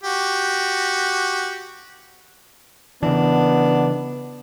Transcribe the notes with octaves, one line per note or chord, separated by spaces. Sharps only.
F#4 G4
C#3 E3 B3 D4